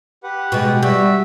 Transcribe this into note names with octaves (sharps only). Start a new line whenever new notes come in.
G4 B4 F#5
B2 G#3
G3 F#4 E5